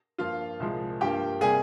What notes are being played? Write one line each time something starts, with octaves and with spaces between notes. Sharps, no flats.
G2 F3 A#3 F4 F5
C2 A#2 F3 G#3
G2 F3 A#3 G4 G5
C3 G3 A#3 G#4 G#5